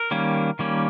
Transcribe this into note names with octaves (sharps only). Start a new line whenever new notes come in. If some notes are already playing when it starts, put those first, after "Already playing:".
Already playing: A#4
D#3 G3 A#3 C#4
D#3 G3 A#3 C#4